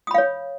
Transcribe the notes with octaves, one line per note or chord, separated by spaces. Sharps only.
C#5 F5 B5 D#6